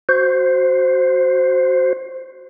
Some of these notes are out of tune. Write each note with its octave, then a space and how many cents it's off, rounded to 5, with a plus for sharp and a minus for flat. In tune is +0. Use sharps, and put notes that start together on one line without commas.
F#4 +0 C5 +0